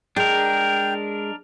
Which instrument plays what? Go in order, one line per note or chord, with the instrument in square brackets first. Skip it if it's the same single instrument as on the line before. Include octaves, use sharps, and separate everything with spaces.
[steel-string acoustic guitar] G#3 [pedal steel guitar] D4 A#4 [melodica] G5